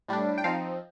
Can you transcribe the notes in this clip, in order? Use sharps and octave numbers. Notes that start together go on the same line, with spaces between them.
A2 G3 D4
G5
F3 C4 D#4 F5